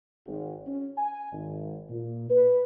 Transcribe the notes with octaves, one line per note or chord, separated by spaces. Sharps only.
G#1
C#4
G#5
G#1
A#2
B4